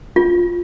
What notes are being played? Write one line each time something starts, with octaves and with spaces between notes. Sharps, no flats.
F4